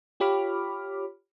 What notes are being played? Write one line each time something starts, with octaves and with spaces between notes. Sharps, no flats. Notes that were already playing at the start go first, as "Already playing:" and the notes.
F4 G4 C#5 B5 D6 F6